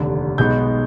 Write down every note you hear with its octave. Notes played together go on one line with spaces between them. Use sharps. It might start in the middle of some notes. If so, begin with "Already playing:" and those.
Already playing: F1 D#2 D3
B1 B2 G#3 B3 D#4 G6